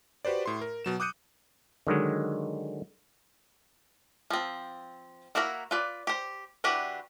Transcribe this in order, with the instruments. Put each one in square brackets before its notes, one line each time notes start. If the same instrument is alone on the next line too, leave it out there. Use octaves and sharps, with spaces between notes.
[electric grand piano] F#4 G4 B4 C5 D5
A2 C6
A#4
B2 F#3 E7
D6 D#6 F#6 G6 C#7 D#7
[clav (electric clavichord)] D3 D#3 F#3 G#3
[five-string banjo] F3 C4
A#3 E4 F#4 A#4 B5
F4 B4 D5
G4 C5
E3 D4 F#4 G4 B4